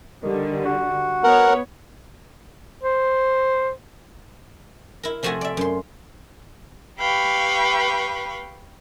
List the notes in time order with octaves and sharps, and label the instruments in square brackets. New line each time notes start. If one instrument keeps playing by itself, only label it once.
[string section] D3 G3 [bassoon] D#3
[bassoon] F#4
[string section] B3 C#5 [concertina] A#4 F#5
[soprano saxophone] C5
[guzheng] E4 A#4
C3 F3 A3 F#4 E5 G#5
D5 E5
F#2 C6
[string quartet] G4 B4 F5 G5 B5 C#6